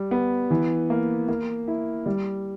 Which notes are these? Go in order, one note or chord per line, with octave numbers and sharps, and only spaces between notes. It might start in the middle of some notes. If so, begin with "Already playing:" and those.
Already playing: G3
B3
E3
A#3
A#3
E4
G3